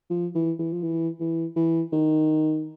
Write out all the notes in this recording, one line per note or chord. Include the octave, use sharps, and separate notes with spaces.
F3
E3
E3
F3
E3
E3
E3
D#3